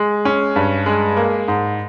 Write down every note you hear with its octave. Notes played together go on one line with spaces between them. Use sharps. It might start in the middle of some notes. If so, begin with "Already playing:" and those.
Already playing: G#3
C#4
G2
G#3
A#3
G#2